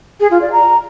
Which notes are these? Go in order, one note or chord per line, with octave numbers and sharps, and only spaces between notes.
G#4
F4
D5
A#5